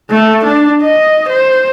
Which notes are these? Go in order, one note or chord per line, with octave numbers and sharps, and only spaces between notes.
A3
D4
D#5
C5